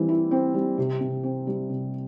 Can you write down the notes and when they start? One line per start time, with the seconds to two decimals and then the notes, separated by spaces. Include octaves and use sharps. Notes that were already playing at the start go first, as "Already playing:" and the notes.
Already playing: E3 G3 C4
0.09 E4
0.31 C4
0.54 G3
0.78 C3
1.01 C3
1.23 C4
1.47 G3
1.70 C3